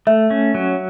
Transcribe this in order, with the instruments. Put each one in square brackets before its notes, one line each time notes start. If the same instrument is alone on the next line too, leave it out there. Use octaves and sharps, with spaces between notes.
[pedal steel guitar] A3 [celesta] E5
[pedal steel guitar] C#4
F#3